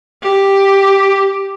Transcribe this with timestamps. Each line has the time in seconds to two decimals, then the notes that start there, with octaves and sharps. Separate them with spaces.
0.23 G4